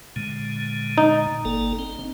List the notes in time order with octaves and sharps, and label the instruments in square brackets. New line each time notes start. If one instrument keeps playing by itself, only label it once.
[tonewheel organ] A#2 D3 G#3
[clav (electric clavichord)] D#4
[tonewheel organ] G1 A#3 A4
C4